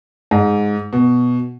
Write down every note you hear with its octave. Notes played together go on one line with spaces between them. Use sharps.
G#2
B2